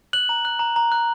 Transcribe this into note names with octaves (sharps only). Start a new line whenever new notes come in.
F#6 F#7
A#5
F#6
A#5
A#5
F#6